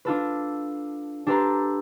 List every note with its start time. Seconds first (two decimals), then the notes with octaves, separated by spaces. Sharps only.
0.05 D4 F4 A4 B4
1.27 D4 G4 A4 B4 A#5 C6